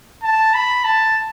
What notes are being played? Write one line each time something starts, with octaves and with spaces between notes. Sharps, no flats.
A5
B5
A5